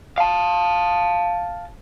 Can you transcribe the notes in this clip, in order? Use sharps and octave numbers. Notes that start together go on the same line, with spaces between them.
F5 A5